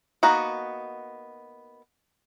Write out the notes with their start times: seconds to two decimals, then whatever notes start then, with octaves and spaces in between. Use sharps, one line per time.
0.23 A#3 B3 D#4 F#4